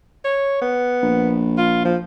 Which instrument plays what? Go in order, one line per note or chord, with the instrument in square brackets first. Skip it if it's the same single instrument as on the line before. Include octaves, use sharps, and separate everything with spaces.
[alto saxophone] C#5
B3
[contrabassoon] A#1
[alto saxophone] F4
F3